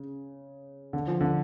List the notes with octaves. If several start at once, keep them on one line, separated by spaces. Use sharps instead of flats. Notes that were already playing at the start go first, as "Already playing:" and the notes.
Already playing: C#3
D3
F3
D3